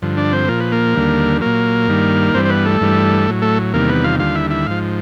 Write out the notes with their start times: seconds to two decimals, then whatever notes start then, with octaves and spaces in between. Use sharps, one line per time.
0.02 G2 D3 F3
0.17 D4 D5
0.32 C4 C5
0.48 A#2 F3 A#4
0.60 B4
0.72 A#3 A#4
0.95 D#2 D3 G3
1.41 A#2 F#3 A#3 A#4
1.88 G2 D#3 G3
2.34 G2 E3 G3 C4 C5
2.45 C5
2.50 B3 B4
2.65 A3 A4
2.81 G2 E3 G3
3.27 A2 F#3
3.42 A3 A4
3.73 E2 C3 D#3 G3 A#3 A#4
3.89 B3 B4
4.04 F4 F5
4.19 D#2 D3 G3 F4 F5
4.35 E4 E5
4.50 E4 E5
4.67 G#2 F3 F5